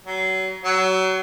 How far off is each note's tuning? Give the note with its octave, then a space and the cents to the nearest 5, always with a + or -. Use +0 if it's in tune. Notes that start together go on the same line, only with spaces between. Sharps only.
F#3 +30
F#3 +25